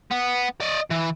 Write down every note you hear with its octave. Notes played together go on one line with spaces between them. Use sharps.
B3
D5 D#5
E3